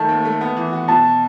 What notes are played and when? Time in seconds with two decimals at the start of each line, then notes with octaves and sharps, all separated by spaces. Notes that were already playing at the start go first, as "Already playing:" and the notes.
Already playing: D#3 A3 A5
0.09 D#2
0.25 A3
0.41 B3
0.57 E3
0.72 F#4
0.88 B2 A5